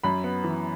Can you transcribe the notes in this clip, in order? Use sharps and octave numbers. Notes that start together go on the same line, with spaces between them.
F#2 B5
B3
E3